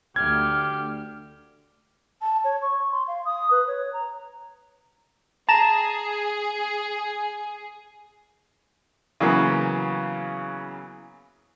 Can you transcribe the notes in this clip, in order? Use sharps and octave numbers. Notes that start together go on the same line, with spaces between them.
D2 D3 G4 F6 G#6
A5
C#5
C#6
C6
F5
D#6
B4
C#5
A#5
G#4 A5 A#5 E7
C#3 E3 F#3 A#3 B3